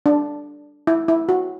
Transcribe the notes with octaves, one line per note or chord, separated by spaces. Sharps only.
D4
E4
E4
F#4